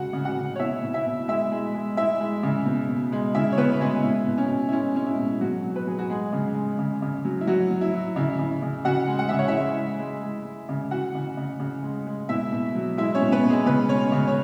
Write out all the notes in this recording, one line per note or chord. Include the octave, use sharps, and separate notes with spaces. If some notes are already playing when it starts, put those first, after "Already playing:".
Already playing: C#3 G#3 F#4 F#5
C#3
F#4 F#5
C#3
C#5
B2 E4 E5
B2
E4 E5
B2
G#3 E4 E5
G#3
G#3
G#3 E4 E5
G#3
C#3
B2
B2
G#3
C#3 E4 E5
C#5
C#3 B3 B4
C#3 G#3 G#4
B2 E4
B2
C#4
B2
E4
G#3 C#4
G#3 C#4
E4
B2
B2 F#3 F#4
F#3
B4
F#3 G#4
F#4
G#3 G#4
C#3
G#3
C#3
C#3
F#3
E4
F#3 F#4
F#3
E4
F#3
C#3 E4
C#3
C#3
C#3 F#4 F#5
G#3
F#5
C#3 E5
C#5
E4 E5
G#3
E3
G#3
G#3
G#3
C#3
E3 F#4 F#5
C#3
C#3
C#3
G#3
G#3
B2 E4 E5
B2
F#3
G#3 E4 E5
C#4 C#5
B2
B3 B4
B2
G#3 G#4
C#3 B3 B4
G#3 C#4 C#5
C#3
C#5